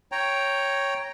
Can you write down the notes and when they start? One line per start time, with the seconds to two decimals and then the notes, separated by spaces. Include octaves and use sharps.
0.12 C#5 G5 A#5